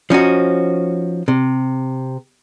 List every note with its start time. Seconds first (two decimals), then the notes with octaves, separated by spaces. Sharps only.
0.10 F3 C#4 D#4 F#4
1.28 C3